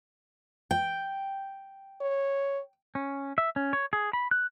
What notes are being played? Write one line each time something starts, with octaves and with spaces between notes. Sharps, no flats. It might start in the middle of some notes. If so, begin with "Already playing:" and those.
G5
C#5
C#4
E5
C#4
C#5
G#4
B5
F#6